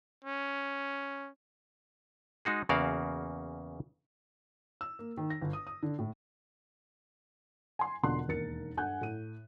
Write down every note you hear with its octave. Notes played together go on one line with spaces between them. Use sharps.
C#4
G#3 D#4 F#4 G#4
E2 C#3 A#3 F#4 D5 F5
E6
A#3
D#3
A#6
G1
D#6
D#6
D3
A2
G#5 C6
E1 B2 D3 F4 C6 F#6
E1 D#2 D#4 A#4 A6 C#7
G2 A4 F#5 G#5 F#6 G6
A2 D#7